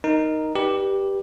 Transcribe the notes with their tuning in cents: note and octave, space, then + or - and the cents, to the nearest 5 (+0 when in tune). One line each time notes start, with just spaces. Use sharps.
D#4 +0 A#4 +0
G4 +0 B4 -25 D5 +5